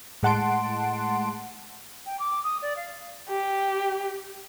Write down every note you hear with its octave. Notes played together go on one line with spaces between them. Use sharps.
A2 G#3 F#5 A5 C6 D7
G5
D6
D#6
D5
F5
G4